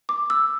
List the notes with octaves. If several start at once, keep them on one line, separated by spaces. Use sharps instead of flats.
D6
E6